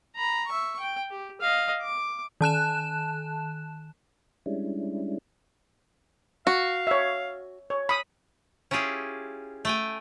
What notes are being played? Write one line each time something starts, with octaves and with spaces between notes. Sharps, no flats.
A#5 B5
E5 C#6
G5
G4
D#5 F5
D6
D#3 A5 F#6 E7
G3 G#3 C#4 D4 E4
F#4 F5
C#5 E5
C#5
B5 D#6
C#4 E4 F4 G4 G#4
A3 G5 G#5